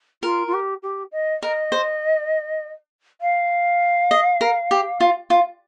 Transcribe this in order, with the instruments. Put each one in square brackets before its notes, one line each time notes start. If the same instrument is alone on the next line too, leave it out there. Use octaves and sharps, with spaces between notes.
[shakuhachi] F4 [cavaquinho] A#4
[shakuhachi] F4
G4
G4
D#5
[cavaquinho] A#4 [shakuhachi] D#5
[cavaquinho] C5
[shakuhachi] F5
[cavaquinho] D#5
A#4
G4
F4
F4